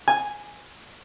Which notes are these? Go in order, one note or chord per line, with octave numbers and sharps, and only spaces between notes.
G#5